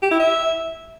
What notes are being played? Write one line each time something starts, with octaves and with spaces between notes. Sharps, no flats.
G4
E4
E5